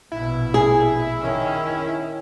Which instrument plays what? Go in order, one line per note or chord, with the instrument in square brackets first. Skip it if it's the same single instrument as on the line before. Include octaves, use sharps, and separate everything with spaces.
[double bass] A#1 B2 [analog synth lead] E4
[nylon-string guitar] G#4
[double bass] D#3 C#4